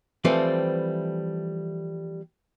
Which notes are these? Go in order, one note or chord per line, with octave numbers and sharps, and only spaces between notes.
E3 F3 G3 A3 C4 B4